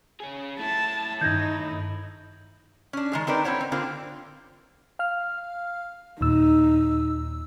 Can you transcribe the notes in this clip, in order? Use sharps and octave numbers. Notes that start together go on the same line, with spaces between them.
C#4 G#4
A3 E4 A5
G2 D#3 D#4 G6 G#6 A#6
C#4 D4
D#3 G#3 G#4
C4 D#4 A#4 B4 D5
C4 E4 C5 C#5 F#5
C4
D3 A#3 C4 F4
F5 F6
D#2 A#2 D#4 E6